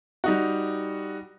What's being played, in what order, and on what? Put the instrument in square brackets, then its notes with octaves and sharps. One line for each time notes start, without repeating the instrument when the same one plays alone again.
[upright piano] G3 D#4 F#4